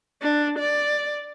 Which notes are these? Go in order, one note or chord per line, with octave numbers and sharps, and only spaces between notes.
D4
D5